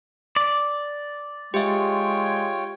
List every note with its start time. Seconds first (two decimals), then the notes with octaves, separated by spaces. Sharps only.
0.36 D5
1.54 G#3 F4 G4 C#5 E5 G5